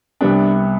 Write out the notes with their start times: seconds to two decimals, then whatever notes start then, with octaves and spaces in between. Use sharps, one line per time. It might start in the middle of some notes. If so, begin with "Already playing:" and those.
0.21 C2 C3 G3 B3 D4